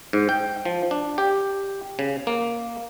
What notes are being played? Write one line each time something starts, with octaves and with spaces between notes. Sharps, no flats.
G#2
G5
F3
D4
G4
C#3
A#3